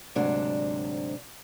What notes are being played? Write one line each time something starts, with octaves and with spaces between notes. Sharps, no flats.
D2 G#2 C3 F#3 D4 C5